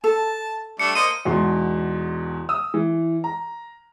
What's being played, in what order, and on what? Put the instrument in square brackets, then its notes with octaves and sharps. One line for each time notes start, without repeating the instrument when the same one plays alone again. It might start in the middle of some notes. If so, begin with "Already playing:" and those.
[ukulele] A4 [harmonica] A5
[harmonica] G3 A3 D4 [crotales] C#7
[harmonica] A#3 C5 D#5 [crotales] D#7
[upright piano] E2 G#2 B2 C6
D#6 E6
E3
A#5